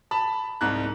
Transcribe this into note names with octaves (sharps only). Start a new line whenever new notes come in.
A5 B5
C2 G#2 F#6